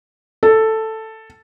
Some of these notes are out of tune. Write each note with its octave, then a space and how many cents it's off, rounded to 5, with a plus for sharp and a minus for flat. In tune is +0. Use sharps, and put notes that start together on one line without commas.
A4 +5